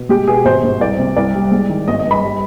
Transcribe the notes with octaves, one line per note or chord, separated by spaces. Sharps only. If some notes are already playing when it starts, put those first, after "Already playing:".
Already playing: B2
G#3 G4
B2 G#4
G#1 C5
G#2
C2 D5
C3
C2 D5
G3
G#3
D#3
G#1 D#5
D#5
G2
B5
G3